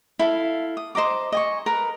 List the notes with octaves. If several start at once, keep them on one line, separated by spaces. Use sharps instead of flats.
E4 A4 F5
D#6
C5 D#5 A#5 D6
D#5 G#5 C#6
A#4 B4